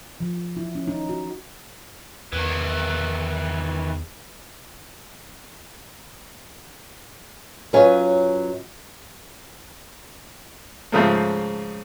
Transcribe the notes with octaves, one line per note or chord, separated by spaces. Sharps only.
F3
E4
C#4
D#4
F#4
E2 D#3 E3
F#2 F#3 F4 B4 C#5 G#5
G#2 C#3 F3 A3 C5